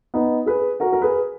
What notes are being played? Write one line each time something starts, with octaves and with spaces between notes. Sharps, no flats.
B3 D#4
G#4 B4
F#4 A#4
A#4
G#4 B4